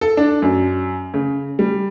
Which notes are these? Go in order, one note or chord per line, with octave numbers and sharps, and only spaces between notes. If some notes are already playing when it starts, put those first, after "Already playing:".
A4
D4
F#2
C#3
G3